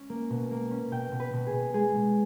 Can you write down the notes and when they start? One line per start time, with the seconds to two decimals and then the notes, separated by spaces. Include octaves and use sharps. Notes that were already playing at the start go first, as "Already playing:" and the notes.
Already playing: C#4
0.10 A#3
0.30 B2
0.51 A#3
0.71 C#4
0.91 B2 G5
1.12 B2
1.20 B4
1.33 B2
1.46 G#4
1.53 B2
1.74 G#3 G#4
1.95 B2